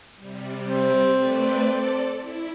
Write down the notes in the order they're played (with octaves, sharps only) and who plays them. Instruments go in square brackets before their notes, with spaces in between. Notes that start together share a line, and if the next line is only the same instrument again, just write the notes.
[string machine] C3 G3
[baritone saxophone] C4
[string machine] A3 B4 D5
A4 D5
E4